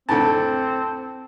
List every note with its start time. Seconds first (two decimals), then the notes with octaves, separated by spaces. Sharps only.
0.09 F2 A2 D3 C4 A5